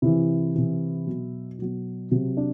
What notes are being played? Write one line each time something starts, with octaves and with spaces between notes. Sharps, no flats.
C3 E3 E4
C3 E3
B2 F#3
B2 F#3
C3 F#3
D4